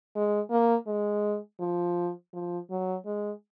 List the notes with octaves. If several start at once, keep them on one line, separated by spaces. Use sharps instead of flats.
G#3
A#3
G#3
F3
F3
F#3
G#3